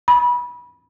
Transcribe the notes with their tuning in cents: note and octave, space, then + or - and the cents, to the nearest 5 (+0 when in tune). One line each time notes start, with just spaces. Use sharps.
B5 -25